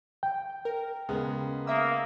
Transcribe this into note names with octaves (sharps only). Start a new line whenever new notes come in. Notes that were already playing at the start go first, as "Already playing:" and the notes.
G5
A#4
C#3 G#3 B3
A#3 E5 D#6 E6